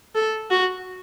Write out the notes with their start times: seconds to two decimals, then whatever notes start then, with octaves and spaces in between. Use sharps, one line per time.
0.15 A4
0.50 F#4